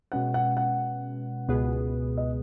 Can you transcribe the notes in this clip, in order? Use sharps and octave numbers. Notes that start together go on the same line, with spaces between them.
B2 G#3 C#4 B4 F#5
F#5
F#5
C#2 B2 B3 G#4 B4
D#5